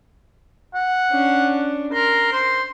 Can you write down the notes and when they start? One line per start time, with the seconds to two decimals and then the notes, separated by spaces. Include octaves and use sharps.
0.74 F#5
1.11 C#4 D4
1.93 A#4 C6
2.32 C5